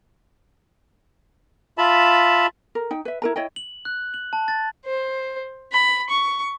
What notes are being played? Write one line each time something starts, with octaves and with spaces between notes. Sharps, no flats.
F4 E5 A5 B5
A#4
D#4 G5
B4 E5
E4 A#4 A#5
E4 C#5 D#5 G5
F#7
F#6
F#7
A5
A6
C5
B5
C#6